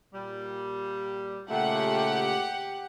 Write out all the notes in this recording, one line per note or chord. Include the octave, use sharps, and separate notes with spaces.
A#2 G3
A#2 C#3 A3 G4 F#5